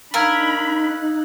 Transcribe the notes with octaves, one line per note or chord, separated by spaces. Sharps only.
D4 D#4 A#4 F5 B5 E6 F#6 G#6